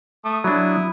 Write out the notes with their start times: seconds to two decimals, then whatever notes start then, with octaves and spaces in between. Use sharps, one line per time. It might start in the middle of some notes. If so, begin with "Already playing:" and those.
0.25 A3 D#6
0.44 F#3 D4 E4